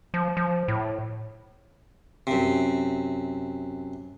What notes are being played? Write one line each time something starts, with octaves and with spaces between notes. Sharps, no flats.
F3
F3
A2
F#2 C3